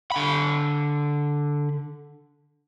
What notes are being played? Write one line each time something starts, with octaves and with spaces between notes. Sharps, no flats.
D3 B5